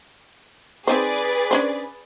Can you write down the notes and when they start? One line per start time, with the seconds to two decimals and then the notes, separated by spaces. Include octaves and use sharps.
0.87 C4 D#4 G#4 B4 C5 D5
1.51 C#4 D4 C5